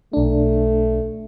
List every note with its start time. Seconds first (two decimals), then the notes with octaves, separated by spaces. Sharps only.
0.13 B1 A3 D4